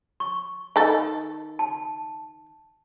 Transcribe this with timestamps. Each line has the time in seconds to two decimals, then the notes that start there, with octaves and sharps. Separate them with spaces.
0.20 C#6
0.76 D#3 A4
1.59 A5